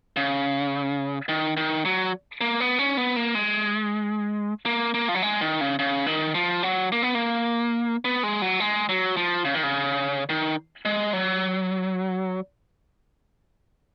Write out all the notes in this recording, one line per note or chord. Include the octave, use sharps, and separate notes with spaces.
C#3
D#3
D#3
F#3
A#3
B3
C#4
B3
A#3
G#3
A#3
A#3
F3
F#3
G#3
D#3
C#3
C#3
D#3
F3
F#3
A#3
B3
A#3
B3
G#3
F#3
G#3
F#3
F3
C#3
D#3
C#3
D#3
G#3
F#3